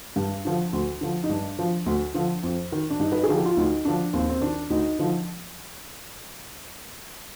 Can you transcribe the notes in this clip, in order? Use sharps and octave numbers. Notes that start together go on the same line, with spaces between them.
G2
D3 F3
D2
D3 F3
D#4
G2 D4
F3
D2
D3 F3
F2
D#3
D4
G2 D#4
B4
G#4
D3 F3
G4
F4
D2 D#4
D3 F3 D4
D#2 C4
C4
D#3 D4
D2 D#4
D3 F3